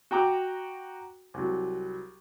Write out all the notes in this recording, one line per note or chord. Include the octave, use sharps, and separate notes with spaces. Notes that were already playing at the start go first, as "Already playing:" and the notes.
F#4 G5 A#5 D6
C2 F#3